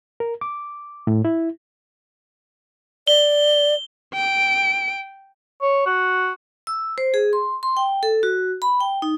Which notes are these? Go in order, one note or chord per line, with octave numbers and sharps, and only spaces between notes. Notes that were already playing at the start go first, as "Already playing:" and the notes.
A#4
D6
A2
E4
D5 G7
G5 D7
C#5
F#4
E6
C5
G#4
C6
C6
G5
A4
F#4
B5
G5
D#4